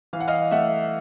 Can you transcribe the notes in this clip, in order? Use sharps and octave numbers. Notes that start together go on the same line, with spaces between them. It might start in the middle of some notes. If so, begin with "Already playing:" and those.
E3 F5
F#5
D#5 F5
A3 E5 F#5